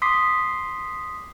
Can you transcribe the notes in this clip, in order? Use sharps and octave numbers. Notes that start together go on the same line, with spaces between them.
C6 D6 D#6 B6 C7